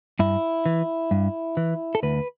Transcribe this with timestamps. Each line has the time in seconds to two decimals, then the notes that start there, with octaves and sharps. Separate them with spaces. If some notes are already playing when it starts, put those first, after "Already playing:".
0.19 G2 E4
0.66 E3
1.11 G2
1.57 E3
1.95 A4
2.03 D2 B4